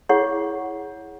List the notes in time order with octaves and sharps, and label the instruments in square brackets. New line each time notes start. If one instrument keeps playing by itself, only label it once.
[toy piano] E4 G#4 C#5 F#5 C#6